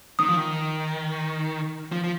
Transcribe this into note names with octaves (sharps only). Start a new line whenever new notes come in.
D#3 D#6
F3
D#3
F3
F3